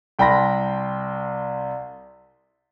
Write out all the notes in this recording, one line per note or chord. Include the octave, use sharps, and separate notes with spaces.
C2 G5 A5 B5 C6 A#6